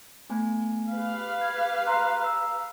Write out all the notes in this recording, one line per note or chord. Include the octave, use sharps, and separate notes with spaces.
A3 B3 G#5
G4 B4 F5
G#6
A#5 C6 F#6
A#5 E6